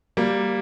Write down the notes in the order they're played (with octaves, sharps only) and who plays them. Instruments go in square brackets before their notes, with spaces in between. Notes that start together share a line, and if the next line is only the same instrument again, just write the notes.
[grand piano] G3 A#3